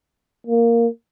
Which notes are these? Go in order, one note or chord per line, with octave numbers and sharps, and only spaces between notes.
A#3